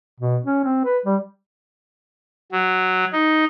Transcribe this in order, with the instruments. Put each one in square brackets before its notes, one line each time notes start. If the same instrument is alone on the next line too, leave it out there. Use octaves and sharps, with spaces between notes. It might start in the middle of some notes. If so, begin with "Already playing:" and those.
[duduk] B2
C#4
C4
B4
G3
[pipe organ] F#3
D#4